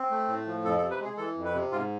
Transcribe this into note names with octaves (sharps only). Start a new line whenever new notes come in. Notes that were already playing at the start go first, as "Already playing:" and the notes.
Already playing: C4
A3
A2
F3
F2 A4
A4
C3
B4
G#3 G#4
E3 A4
F2
B4
C3
G#2 F4